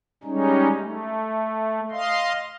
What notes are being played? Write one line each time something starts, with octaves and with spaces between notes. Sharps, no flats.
G3 G#3 C#4 D#4
A3
D#5 F5 C6